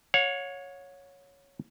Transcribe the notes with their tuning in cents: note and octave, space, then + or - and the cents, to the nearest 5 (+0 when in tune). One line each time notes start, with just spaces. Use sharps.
C#5 +0 F#5 -45